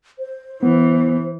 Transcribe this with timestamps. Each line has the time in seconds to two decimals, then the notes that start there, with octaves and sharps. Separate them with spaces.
0.19 C5
0.63 E3 B3